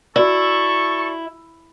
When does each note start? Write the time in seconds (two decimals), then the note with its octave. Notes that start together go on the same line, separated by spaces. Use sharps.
0.16 E4 F#4 A4 D5 C#6